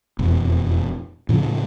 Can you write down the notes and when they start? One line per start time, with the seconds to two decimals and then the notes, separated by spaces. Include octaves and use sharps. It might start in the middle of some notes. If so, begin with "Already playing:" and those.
0.19 E1 F2
1.29 A2 C#3 E3 F3